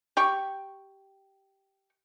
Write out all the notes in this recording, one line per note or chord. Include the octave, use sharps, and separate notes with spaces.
G4 G5 C#6